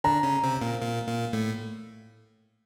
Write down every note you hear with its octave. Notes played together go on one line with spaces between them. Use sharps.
D3 D4 A#5
C#3 C#4
C3 C4
A#2 A#3
A#2 A#3
A#2 A#3
A2 A3